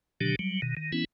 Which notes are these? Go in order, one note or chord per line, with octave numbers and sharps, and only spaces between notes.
B2 D3 D#3 F#3 D4 G4
F#3 G3
B2 D#3
D#3
E3 B3 C#4 E4